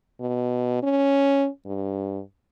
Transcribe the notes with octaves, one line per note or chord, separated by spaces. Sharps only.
B2
C#4
G2